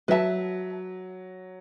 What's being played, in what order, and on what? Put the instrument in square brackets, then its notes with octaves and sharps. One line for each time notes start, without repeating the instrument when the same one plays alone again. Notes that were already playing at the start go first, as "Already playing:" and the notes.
[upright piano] F#3 [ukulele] B4 E5 A5